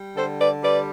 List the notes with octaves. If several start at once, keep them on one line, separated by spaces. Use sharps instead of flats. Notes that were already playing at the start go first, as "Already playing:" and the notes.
Already playing: G3
D3 A4 C5
B4 D5
G3 B4 D5